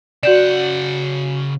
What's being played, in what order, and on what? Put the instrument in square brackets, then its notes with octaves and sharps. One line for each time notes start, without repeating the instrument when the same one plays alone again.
[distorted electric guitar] C#3 F#5 [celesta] F#4 G6 E7 [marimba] D5